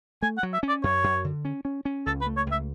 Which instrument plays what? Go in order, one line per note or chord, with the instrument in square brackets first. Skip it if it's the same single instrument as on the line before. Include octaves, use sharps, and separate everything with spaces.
[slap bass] A3 [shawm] G#5
[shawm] F#5
[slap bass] F#3
[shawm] E5
[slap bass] C#4
[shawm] D5
[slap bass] F#2 [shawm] C#5
[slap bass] F#2
D3
C#4
C#4
C#4
[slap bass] C#2 [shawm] A4
[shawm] B4
[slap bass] A3
[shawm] C#5
[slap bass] C#2 [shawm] E5